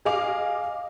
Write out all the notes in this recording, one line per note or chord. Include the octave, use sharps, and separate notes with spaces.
G#4 D#5 F5 D6 F7